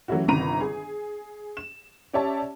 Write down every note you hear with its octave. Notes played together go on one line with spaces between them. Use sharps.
E3 F#3 A3 C#4 E4 F#4
G1 C3 D#3 A#5 B5 D#7
G#4
E7
C#4 G4 C#5 D5 E5 A5